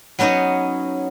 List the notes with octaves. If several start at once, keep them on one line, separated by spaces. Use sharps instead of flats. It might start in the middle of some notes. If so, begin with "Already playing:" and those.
F#3 B3 C#4 D#4 D#5